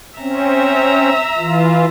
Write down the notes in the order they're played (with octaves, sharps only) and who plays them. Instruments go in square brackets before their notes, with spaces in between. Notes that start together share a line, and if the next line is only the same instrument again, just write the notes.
[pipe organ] C4 C#4 [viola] E5 A#5
[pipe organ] E3 F4